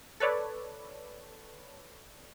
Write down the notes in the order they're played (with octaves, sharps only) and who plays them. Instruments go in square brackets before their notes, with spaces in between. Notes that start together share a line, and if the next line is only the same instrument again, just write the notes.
[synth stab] A4 B4 C#5 D5